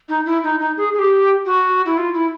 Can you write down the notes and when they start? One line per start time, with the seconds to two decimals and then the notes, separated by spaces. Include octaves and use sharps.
0.09 D#4
0.26 E4
0.44 D#4
0.60 D#4
0.77 G#4
0.94 G#4
0.99 G4
1.46 F#4
1.86 E4
1.97 F4
2.14 E4